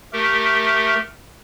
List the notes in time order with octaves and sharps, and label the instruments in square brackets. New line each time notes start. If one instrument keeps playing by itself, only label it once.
[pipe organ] A3 G4 A#4